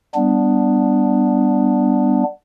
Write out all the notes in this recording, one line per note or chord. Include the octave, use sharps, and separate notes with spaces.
G3 B3 D4